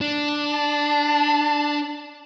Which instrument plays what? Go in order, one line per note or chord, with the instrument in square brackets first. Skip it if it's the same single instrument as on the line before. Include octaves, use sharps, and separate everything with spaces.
[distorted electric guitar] D4
[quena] A5